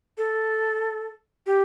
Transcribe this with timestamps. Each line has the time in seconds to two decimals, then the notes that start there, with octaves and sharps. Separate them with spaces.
0.18 A4
1.46 G4